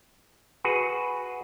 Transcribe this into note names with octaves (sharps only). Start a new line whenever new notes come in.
F#4 G#4 B4